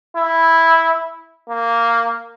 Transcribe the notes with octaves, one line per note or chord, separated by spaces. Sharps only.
E4
A#3